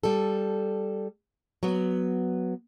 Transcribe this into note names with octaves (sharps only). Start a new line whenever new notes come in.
G3 A4
F#3 B3